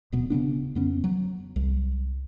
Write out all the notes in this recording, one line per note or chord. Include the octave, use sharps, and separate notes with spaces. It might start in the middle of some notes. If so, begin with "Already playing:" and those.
D1 B2 B3
C#3 E3 B3 D4
F2 B3 C#4
F#3
C2